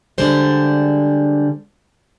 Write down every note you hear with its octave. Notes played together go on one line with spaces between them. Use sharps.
D3 G3 G#3 C5 D5